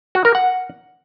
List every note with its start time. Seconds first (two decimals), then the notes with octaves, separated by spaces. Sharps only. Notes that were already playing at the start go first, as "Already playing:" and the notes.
0.15 F#4
0.25 A#4
0.35 F#5